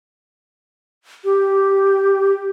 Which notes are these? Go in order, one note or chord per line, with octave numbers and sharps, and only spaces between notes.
G4